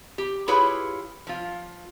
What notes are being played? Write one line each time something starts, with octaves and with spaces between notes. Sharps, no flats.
G4
E4 F4 G4 G#4 B4 C#5
F3 F4